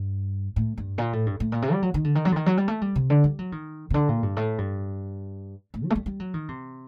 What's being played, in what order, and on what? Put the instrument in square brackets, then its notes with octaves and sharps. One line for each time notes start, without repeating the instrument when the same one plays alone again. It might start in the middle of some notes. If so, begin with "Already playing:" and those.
Already playing: [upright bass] G2
A2
G2
A#2
A2
G2
A2
A#2
C3
G3
F#3
D#3
D3
D#3
F#3
D3
D#3
F#3
G3
A3
G3
C3
D3
G3
F#3
D#3
C3
D3
A#2
G2
A2
G2
A2
F#3
A3
G3
G3
F#3
D#3
C3